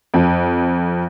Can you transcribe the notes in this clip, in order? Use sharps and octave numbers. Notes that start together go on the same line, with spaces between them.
F2